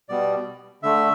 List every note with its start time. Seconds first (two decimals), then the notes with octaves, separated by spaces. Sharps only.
0.09 B2 G3 B3 D5
0.83 D3 A3 E5